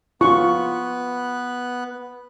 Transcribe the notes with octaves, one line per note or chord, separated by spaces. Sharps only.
B3 F4 C#6 F#6